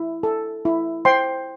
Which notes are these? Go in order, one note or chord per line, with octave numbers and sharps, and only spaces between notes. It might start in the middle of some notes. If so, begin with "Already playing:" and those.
Already playing: E4
A4
E4
C5 G5 C6